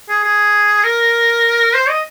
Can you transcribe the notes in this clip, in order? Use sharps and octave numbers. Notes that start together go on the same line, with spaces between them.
G#4
G#4
A#4
C5
D#5